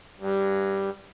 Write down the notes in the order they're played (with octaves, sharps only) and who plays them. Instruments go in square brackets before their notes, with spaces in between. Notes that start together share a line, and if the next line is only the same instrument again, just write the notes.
[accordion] G2